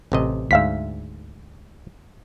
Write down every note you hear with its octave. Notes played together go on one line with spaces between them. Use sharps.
A1 C3 D#5
D2 G#2 E5 F5 B6